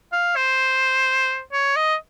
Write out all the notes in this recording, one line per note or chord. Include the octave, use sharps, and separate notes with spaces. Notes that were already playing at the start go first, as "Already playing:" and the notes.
F5
C5
C#5
D#5